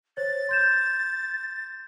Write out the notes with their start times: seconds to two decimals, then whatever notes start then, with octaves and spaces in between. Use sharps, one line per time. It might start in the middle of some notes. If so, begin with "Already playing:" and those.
0.17 C5 C#5 A6
0.49 C6 G6 E7